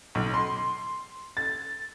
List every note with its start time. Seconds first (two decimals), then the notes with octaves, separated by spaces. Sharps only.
0.15 B1
0.34 C6
1.37 A6